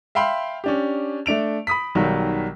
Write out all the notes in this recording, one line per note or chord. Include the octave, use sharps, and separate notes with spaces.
E5 F5 G5 B5 C6
C#4 D4 G4
A3 D4 D7 F7
B5 D#6 B6
B1 D#3 F#3 G3